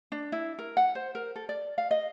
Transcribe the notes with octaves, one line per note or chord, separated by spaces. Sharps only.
D4
E4
A#4
F#5
C5
A#4
A4
D5
F5
D#5